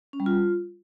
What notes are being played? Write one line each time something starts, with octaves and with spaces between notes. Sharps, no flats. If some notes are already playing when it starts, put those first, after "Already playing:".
C#4
G3
F4